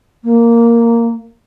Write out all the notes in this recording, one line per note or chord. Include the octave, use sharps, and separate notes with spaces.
A#3